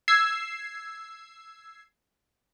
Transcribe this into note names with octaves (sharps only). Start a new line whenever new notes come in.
E6 G#6 C7